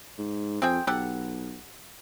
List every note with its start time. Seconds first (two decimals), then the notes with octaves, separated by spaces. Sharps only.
0.18 G#2
0.62 F2 C4 G#4 G5
0.87 B1 G4 A4 F#5